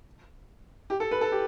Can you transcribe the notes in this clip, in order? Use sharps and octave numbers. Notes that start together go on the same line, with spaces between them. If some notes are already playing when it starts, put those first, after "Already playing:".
G4
A4
B4
A4
G4